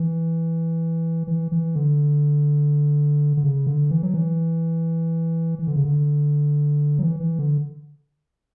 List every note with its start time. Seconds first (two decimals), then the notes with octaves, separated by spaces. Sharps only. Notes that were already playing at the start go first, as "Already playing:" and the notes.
Already playing: E3
1.27 E3
1.52 E3
1.75 D3
3.37 D3
3.44 C#3
3.67 D3
3.90 E3
4.03 F#3
4.14 E3
5.59 E3
5.67 D3
5.76 C#3
5.85 D3
6.99 F#3
7.03 E3
7.20 E3
7.39 D3